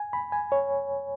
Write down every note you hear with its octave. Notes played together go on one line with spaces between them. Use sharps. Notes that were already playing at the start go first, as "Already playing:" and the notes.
Already playing: G#5
B5
G#5
C#5